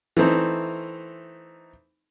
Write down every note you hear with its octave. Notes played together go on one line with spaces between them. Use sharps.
E3 A3 C4 D#4